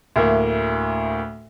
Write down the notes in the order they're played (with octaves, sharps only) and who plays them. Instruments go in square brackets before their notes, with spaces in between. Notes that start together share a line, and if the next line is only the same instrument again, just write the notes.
[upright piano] D2 A2 A#3